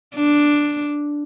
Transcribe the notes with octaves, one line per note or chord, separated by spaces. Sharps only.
D4